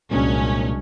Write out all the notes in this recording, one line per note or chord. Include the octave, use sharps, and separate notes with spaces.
C2 A#2 F#3 G#3 C#4 D4